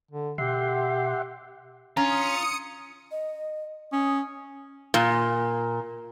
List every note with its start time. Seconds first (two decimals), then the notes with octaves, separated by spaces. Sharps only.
0.11 D3
0.38 B2 G4 E5 F#5 C6
1.97 C#4 F4 A#5 D#6 C#7
3.11 D#5
3.93 C#4 D#6
4.94 A#2